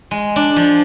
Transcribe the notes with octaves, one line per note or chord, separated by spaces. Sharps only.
G#3
D4
F3